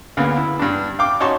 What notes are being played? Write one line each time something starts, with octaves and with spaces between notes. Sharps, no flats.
D2 C#3 A#3 B3
E4
G2 D4
F5 G5 D6
C#4 D#4 F#4 A5 C6 C#6